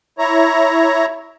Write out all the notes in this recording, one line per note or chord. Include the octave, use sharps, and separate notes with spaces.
E4 C#5 A#5